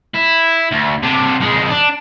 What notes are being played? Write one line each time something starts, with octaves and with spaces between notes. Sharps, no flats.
E4
D2
C3 D4
F2 G#3
D4